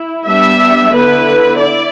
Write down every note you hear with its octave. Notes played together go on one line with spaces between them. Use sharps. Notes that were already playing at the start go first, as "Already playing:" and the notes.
Already playing: E4
G3 B3 D4 E5
D3 B3 E4 B4
E4 D5